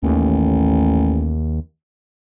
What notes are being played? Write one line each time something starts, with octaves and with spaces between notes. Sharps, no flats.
A1 D#2